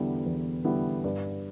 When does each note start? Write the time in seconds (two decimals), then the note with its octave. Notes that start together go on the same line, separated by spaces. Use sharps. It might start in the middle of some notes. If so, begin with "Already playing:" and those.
Already playing: E2 D3 G3 B3 E4
0.26 E2
0.64 D3 G3 B3 E4
1.04 G2